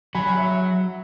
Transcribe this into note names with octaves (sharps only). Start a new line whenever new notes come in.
F#3 G#5 B5
E5